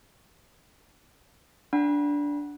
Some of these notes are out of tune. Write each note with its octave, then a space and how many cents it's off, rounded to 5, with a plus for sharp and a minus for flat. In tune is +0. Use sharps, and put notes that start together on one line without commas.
D4 -10 F#5 +0 B5 -30